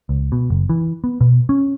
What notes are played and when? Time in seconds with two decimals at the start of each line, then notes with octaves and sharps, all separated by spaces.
0.09 C#2
0.32 B2
0.50 F#1
0.69 E3
1.04 B3
1.21 B2
1.49 C#4